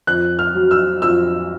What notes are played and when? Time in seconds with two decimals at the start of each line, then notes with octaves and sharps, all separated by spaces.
0.07 F2 F#6
0.39 F6
0.55 F#3
0.71 E6
1.02 F2 E6